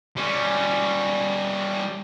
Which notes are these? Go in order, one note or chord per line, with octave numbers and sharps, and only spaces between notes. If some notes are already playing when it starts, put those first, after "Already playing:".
G3 C#4